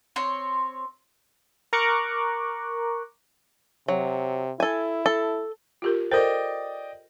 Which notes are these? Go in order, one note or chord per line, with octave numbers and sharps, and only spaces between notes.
C4 C#5 C6
A#4 A#5 C#6 D6 F#6
C3 F#3
E4 A4 G#5
A4
F4 G4 A#4
A4 A#4 C5 D5 D#5 G5